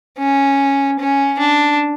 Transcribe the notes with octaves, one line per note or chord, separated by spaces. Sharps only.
C#4
C#4
D4